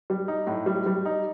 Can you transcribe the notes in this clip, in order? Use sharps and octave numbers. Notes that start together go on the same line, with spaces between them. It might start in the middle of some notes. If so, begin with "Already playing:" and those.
G3
D#4
A2
G3
G3
D#4